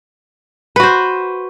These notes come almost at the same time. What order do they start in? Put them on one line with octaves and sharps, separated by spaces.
B4 F#4 C5